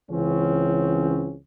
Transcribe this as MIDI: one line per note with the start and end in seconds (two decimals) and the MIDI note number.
0.10 1.35 37
0.10 1.35 52
0.10 1.35 60
0.10 1.35 61